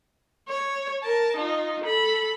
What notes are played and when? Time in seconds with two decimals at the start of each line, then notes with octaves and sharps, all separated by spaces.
0.49 C#5
1.04 A#4 A5
1.37 D#4 F4
1.84 A4 B5